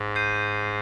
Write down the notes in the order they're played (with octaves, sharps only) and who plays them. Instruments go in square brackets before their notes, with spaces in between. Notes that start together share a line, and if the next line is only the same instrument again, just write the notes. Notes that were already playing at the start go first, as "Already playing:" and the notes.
Already playing: [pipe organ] G#2
[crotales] G6 C7 D#7